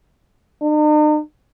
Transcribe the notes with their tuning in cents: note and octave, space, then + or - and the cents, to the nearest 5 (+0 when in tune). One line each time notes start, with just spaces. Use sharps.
D#4 -45